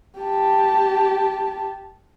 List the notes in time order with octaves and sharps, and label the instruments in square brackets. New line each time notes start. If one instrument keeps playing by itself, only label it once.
[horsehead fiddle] G4 A5